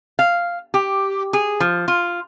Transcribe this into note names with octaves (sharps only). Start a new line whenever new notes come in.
F5
G4
G#4
F3
F4